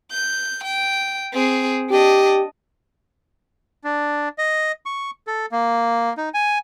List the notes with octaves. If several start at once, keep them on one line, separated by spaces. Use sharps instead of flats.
G6
G5
C4 G#4
D4 G4 D#5
D4
D#5
C#6
A4
A#3
D#4
G#5